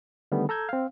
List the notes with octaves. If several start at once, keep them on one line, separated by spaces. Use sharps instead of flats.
D3 D#3 G3 A3 B3
A4 A#5 E6 G6 G#6
C4 F5